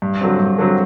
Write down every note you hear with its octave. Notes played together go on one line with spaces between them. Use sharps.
G2
D3 F#3 C4
G2
D3 F#3 C4